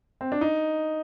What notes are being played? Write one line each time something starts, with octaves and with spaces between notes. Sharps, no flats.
C4
D4
D#4